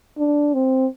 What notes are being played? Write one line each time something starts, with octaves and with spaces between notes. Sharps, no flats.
D4
C4